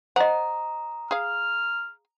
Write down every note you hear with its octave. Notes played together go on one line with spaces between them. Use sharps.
C5 D#5 F#5 A#5 D#6
G#4 F5 F6